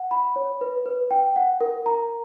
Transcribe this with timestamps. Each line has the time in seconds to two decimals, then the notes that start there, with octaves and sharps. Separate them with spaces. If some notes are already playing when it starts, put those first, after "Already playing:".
Already playing: F#5
0.11 B5
0.36 C#5
0.61 B4
0.86 B4
1.11 G5
1.36 F#5
1.61 A#4
1.86 A#5